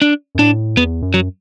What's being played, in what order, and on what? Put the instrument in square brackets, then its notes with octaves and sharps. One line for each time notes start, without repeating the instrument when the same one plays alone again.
[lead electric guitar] D4
[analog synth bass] F#2
[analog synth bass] A2 [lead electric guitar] D4
[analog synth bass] E2 [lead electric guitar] B3
[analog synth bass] F#2
[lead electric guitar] F#3